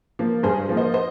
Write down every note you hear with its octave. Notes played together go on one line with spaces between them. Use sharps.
F3 A#3
G2 G#4 C5
F3 A#3
C5 D#5
C5 D#5